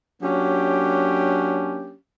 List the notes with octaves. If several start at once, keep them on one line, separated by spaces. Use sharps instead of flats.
F#3 A#3 C#4 D4 G4